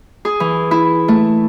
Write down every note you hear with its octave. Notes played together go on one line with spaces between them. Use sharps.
G#4
E3
E4
A3